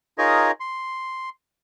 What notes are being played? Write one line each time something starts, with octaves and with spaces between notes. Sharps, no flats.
D#4 F4 G#4 A#4 C#5 D#5
C6